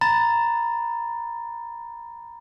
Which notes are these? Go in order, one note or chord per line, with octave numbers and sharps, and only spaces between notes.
A#5 B5 A6